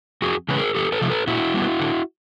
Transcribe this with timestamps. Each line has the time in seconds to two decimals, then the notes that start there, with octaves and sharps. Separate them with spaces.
0.22 F2 F#4 G#4
0.48 C#3 E3 G#3 C#4 B4
0.57 G#4 A#4
0.75 E2 G4 A4
0.92 A4 B4
1.01 C3 F3 A3
1.10 A4 B4
1.27 A#2 E4 F#4
1.54 G3 B3
1.80 D3